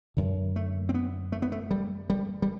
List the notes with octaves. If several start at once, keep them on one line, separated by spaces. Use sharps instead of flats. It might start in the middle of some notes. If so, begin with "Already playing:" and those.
F#2 D3
A3
C4
B3
A3
B3
A3
G3
G3
G3